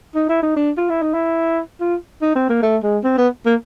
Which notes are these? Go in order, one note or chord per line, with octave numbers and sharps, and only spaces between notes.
D#4
E4
D#4
D4
F4
E4
D#4
E4
F4
D#4
C4
A#3
A3
G#3
C4
B3
A#3